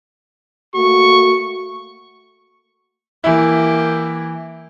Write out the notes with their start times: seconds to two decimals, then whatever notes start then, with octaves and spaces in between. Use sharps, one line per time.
0.74 A3 A#3 F#4 C#6
3.24 E3 A#3 E4 G4